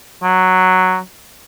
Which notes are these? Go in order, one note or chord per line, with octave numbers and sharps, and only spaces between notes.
F#3